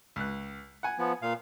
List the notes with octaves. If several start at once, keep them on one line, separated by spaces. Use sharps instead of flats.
C#2 F#6
F#5 G#5
F3 B3
A#2 F5